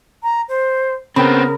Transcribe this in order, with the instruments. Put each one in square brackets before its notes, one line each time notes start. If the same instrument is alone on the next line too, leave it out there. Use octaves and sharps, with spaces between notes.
[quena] A#5
C5
[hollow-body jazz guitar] C#3 G5 [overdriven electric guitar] B3 C4 [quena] A#4 [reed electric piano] B5